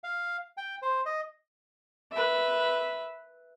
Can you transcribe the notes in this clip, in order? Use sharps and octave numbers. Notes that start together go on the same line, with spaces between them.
F5
G5
C5
D#5
B4 E5